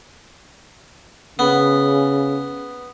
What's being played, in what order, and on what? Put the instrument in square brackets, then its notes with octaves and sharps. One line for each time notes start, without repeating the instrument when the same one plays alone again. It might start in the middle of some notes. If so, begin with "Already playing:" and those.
[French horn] C#3 [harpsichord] B3